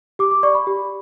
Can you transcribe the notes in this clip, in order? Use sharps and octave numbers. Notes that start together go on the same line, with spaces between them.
G4 D6
D6
D5 C#6
B5
G4